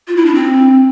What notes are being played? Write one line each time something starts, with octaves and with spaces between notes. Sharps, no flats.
F4
E4
D4
C4